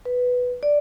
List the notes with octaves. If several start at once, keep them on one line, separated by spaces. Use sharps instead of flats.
B4
D5